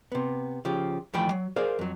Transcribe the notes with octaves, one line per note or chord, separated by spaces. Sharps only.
C3 B3
C#3 F3 G4
D#2 E3 F3 A3 G5 B5
F#3
G#4 A#4 C5 D5 F5
F2 F#3